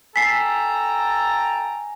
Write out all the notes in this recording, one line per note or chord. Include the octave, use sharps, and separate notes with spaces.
E4 A4 G5 G#5 A#5 B6 C7